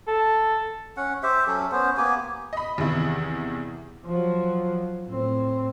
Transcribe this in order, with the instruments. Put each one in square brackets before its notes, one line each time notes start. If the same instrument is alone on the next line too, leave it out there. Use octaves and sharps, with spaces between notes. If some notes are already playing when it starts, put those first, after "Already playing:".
[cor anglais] A4
[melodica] C#4 F#5
G4 C5 E5
F#3 C#4 A4
B3 C#4 C5
A#3 B3 G4 G#5
[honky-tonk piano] D#5 B5
E2 C3 D#3 E4
[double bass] F3 F#3
A2 C4